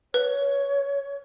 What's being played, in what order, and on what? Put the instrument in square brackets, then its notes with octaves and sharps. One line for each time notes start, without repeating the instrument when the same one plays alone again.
[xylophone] B4 [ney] C#5